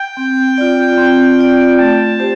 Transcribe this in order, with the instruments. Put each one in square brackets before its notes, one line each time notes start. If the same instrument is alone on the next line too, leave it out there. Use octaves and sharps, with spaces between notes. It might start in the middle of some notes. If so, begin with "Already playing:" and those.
Already playing: [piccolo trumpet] G5
[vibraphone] C4
F4 D5
C4
F4 D5
[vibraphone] A3 [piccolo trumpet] A5
[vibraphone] G4 C5